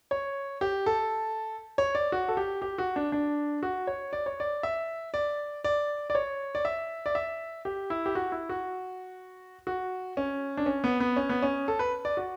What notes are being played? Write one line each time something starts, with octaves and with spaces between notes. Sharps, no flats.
C#5
G4
A4
C#5
D5
F#4
A4
G4
G4
F#4
D4
D4
F#4
C#5
D5
C#5
D5
E5
D5
D5
D5
C#5
D5
E5
D5
E5
G4
E4
G4
F#4
E4
F#4
F#4
C#4
D4
C#4
B3
B3
C#4
B3
C#4
A4
B4
D5
F#4